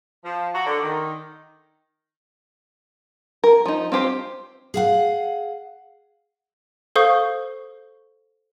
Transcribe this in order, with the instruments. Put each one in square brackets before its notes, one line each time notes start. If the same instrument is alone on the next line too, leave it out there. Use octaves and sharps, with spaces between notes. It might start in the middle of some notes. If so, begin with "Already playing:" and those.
[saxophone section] F3
F#4
D3
D#3
[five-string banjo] A#4
F3 D#4
C4 F4 G4 C5
[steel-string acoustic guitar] G#4 F5 F#5
[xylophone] A4 C5 F5 C#6 D#6 G6